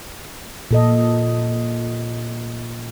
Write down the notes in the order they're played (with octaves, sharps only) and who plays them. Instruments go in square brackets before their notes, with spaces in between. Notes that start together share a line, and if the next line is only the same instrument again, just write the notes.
[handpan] A#2 A4 D#5